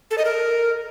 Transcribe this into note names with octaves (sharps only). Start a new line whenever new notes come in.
A4
D#5
A#4